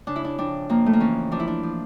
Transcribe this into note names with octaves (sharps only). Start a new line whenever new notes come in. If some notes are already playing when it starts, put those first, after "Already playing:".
C#3 D4
E4
D4
F2 D4
F2 A#3
A3
A#3
E3 C#4
F3 D4
E4
D4
F3